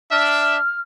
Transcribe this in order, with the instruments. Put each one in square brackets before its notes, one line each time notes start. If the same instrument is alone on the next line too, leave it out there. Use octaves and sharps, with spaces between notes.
[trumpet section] D4 E5 [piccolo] F6